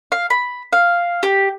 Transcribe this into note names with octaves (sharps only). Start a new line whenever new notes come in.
F5
B5
F5
G4